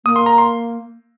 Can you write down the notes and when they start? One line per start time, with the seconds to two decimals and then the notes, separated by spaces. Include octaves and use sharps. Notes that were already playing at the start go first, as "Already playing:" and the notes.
0.05 A#3 D#6
0.16 C6
0.26 A#5
0.38 C6